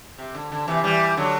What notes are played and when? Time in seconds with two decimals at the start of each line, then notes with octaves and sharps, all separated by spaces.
0.18 C3
0.35 D3
0.52 D3
0.68 C3 E3
0.84 E3 G3
1.17 D3 F#3